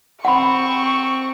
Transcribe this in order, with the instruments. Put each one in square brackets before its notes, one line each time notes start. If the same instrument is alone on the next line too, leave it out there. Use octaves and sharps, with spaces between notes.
[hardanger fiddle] C4 [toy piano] F#5 B5 [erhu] C#6